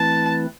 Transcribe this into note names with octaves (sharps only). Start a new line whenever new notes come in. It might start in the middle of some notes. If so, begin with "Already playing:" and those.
Already playing: E3 A3 C4 E4 B4 A5